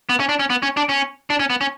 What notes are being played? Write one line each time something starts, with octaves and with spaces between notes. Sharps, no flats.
B3
C#4
D4
C#4
B3
C#4
D4
C#4
D4
C#4
B3
C#4